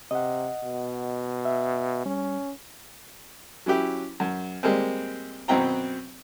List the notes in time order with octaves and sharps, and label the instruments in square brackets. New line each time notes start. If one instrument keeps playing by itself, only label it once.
[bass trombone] C3 [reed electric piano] D#5 F#5
[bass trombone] B2
[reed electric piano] E5
[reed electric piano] G3 [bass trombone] C#4
[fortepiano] F#3 C#4 E4 G4
F#2
G3 G#3 A#3 C4
F#2 B2 F#3 C4 G5 A#5